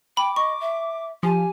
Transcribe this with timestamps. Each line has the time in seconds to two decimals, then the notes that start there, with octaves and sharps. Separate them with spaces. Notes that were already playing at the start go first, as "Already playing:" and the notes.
0.17 G5 B5 D6
0.36 D#5 C#6
0.61 E5
1.23 F3 G4 G#5